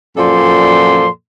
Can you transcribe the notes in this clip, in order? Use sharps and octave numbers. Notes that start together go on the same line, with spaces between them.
F#2 A#2 F3 A4 D5 C6